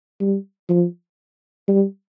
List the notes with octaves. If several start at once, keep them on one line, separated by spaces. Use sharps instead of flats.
G3
F3
G3